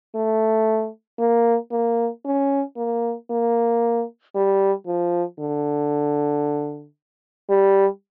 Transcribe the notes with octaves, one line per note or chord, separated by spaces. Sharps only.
A3
A#3
A#3
C#4
A#3
A#3
G3
F3
D3
G3